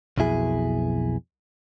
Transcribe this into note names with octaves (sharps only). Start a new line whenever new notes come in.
B1 F2 B2 E4 G#4